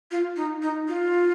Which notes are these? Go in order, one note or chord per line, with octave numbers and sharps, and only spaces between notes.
F4
D#4
D#4
F4